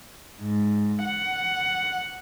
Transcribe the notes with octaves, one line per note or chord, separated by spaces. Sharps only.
G#2
F#5